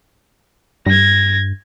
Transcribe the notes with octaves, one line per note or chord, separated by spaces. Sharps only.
G2 G#6 A#6